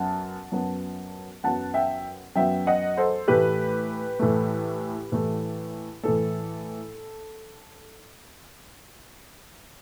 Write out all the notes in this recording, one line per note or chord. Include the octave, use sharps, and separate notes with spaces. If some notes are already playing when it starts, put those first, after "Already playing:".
Already playing: F#2 F#3 B3 F#5 A5
F#2 F#3 B3
F#2 F#3 B3 F#5 A5
E5 G5
F#2 F#3 B3 E5 G5
D#5 F#5
A4 C5
A2 E3 A3 G4 B4
A2 E3 A3
A2 E3 A3
A2 E3 A3 A4